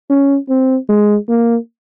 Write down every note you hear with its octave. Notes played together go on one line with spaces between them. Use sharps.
C#4
C4
G#3
A#3